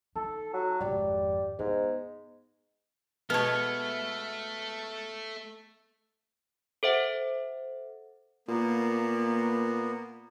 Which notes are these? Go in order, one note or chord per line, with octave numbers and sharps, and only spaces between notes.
D#4 A4
F#3
G#1 F2 G3
G#2 B3
B2 G#3 A3 B3 A4 C#5 A5 F6
A4 C5 E5 F#5
A#2 A#3 B3